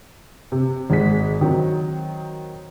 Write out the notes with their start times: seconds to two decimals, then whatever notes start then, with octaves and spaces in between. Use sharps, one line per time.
0.52 C3
0.90 G#1 G#3 B6
1.41 D#3 F#3 C4